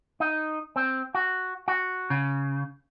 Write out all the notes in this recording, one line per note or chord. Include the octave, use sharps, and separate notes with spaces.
D#4
C4
F#4
F#4
C#3